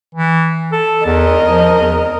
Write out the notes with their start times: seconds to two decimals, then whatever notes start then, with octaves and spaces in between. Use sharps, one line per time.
0.15 E3
0.72 A4
1.06 E2 A#4 D#5
1.47 F3
1.79 E2